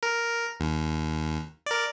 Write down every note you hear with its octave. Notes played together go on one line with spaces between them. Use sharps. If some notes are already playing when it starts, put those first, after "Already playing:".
A#4
D#2
A#4 D5